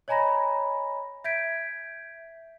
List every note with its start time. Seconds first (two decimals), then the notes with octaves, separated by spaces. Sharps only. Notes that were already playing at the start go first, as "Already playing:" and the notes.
0.08 C#5 D#5 G#5 A#5 B5 A#6
1.24 E5 G6 G#6 B6 D7